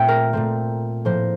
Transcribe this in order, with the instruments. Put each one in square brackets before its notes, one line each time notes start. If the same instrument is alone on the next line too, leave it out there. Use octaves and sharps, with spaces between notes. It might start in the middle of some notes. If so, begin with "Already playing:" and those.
Already playing: [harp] A#2 A3 C4 E5 G5
A#4
A#2 A3 C4
A2 F3 A#3 C5